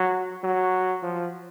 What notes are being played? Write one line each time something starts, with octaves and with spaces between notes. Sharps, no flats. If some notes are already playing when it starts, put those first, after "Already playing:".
Already playing: F#3
F#3
F3